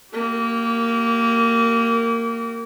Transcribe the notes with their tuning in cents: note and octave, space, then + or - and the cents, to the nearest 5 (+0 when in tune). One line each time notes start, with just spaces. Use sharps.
A#3 -15 G4 -40